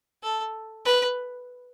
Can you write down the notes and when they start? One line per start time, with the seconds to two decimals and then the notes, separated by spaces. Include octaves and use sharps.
0.23 A4
0.85 B4